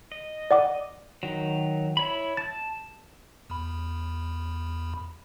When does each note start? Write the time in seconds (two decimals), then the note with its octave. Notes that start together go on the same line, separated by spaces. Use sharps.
0.12 D#5
0.51 D5 F#5 D6
1.23 D#3 F#3
1.97 E4 C#5 B5
2.37 A5 A6
3.50 E2 B5